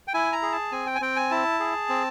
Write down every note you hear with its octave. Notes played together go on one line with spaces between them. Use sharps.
G5
E4 G#5
A#5
G#4
A5
C4 G#5
G5
G#5
C4 G5
G#5
E4 A5
G#4
C4